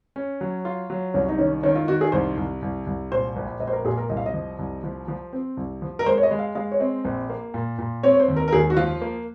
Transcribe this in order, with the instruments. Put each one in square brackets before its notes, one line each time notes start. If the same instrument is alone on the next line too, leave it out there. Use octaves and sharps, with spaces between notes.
[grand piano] C#4
F#3
F4
F#3
[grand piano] C2 [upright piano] C#4
[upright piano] D#4
[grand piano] D#3 [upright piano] C#4
[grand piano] D#3 [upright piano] C#4
[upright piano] F4
[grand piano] D#3 [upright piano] F#4
[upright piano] G#4
[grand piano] C2 [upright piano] C5
[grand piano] C2
C2
C2
[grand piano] A#2 [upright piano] C5
[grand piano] A#1
[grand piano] A#1 [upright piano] D#5
[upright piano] C5
A#4
[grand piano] A#2 [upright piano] G#4
[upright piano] A#4
[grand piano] C2 [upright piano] D#5
[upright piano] F5
D#5
[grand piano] F3
C2
F3
F3
C4
C2
F3
[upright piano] A#4
[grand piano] G#3 [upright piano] C5
[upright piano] C#5
D#5
[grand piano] G#3
[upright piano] F5
[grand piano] G#3 [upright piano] F5
[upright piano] C#5
[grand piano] C4 [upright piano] D#5
[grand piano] A#1
A#3
A#2
A#2
[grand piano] C4 [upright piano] C#5
[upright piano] C#5
C5
[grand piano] D#2
[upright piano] A#4
A#4
[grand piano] D#2 [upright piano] G#4
[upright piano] F#4
[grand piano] F3 [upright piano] F4
[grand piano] A#3